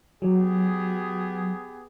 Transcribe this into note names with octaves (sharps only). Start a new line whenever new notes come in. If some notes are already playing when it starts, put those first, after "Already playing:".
F#3 B3 G4 G#4